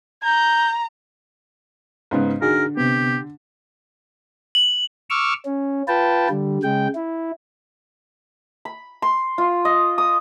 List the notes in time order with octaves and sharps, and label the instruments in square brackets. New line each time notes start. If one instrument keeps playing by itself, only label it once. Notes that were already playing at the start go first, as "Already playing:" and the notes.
[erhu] A#5 [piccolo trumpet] G6
[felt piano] G#2 C#3 B3
[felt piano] D3 [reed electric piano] D#4 F#4 G#4 [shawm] A#4
[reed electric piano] C3 B3 [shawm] G4
[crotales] F#7
[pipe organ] C#6 D6 E6 F6
C#4
F4 B4 G5 A5
D3 G3
C#3 G#3 G5
E4
[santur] B5
C6
F4
D#5
D#6